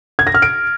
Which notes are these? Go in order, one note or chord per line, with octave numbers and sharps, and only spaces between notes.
G#6
A#6
F6
D7